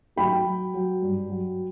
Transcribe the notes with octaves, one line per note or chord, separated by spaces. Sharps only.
F#3 G5 B5
F#3
F#3
G2
F#3